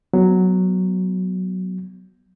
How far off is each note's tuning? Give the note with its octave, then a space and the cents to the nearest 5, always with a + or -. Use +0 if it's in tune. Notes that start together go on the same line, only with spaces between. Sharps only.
F#3 +0 B3 +0